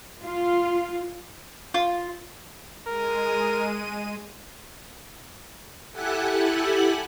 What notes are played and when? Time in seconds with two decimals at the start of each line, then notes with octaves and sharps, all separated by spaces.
0.22 F4
1.74 F4
2.88 G#3 A#4 D#7
5.92 E4 G4 A4 F#5 G#5 F#6